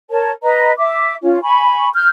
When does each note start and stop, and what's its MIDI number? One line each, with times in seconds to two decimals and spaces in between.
0.11 0.31 70
0.11 0.31 73
0.11 0.31 81
0.43 0.72 71
0.43 0.72 75
0.43 0.72 82
0.78 1.15 76
0.78 1.15 86
1.22 1.39 61
1.22 1.39 65
1.43 1.90 80
1.43 1.90 83
1.43 1.90 85
1.94 2.08 89
1.94 2.08 91